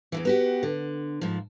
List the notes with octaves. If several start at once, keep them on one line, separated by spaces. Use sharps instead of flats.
E2 G#2 E3
B3 F#4 G4
D3
G#2 F3